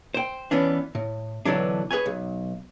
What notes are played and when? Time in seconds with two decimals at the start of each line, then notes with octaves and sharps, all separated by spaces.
0.14 C5 G5
0.51 E3 B3 C#4 D4
0.95 A2
1.45 B2 D3 E3 F#3 D4
1.91 G#4 B4 C#5 G#5
2.06 B1